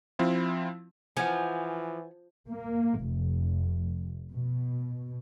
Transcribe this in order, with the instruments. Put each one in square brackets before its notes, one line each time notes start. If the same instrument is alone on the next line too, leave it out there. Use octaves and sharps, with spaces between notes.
[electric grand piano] F3 C4 E4 F4
[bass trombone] E3 [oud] F3 [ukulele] B4 F#5 [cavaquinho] G#5
[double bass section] A#3
F1
B2